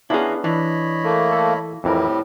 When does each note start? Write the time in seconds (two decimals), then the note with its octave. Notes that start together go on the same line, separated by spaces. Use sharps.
0.10 B3 C#4 D4 E4 G#4 C#5 F5 A#5
0.44 E3 D4 C#5 D#5 B5
1.04 A3 A#3
1.32 A4
1.84 F2 A2 E3 G3 C4 G4 A#4